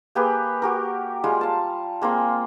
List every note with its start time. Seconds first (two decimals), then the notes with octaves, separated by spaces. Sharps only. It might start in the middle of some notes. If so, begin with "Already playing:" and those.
0.15 A#3 G4 G#4 B4
0.62 F#4 G4 A#4
1.24 G3 G#3 F4
1.41 F5 A5
2.01 G#3 A#3 C4 F4